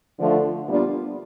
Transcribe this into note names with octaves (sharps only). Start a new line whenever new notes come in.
D3 F3 A3 D4 F4
A#2 G3 B3 D4 F4